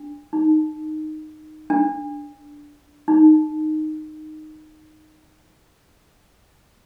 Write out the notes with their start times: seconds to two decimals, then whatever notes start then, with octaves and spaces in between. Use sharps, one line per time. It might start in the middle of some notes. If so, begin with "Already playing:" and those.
Already playing: D4
0.33 D#4
1.70 D4
3.08 D#4